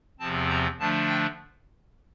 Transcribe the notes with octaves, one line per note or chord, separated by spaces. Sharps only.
E2 C3 F3 C4 A5
A#5
D3 F3 A3 D4 A5
G5